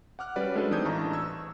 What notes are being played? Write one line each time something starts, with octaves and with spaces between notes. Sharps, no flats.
F#5 D6 F6 F#6
G3 C#4 F#4 B4 C#5 D5
G#3 A3 D4 E4 A4 B4
E3 C4 D#4 D#6 G6 G#6
A1 D4 A5 A#5 C#6
C#6 E6 G#6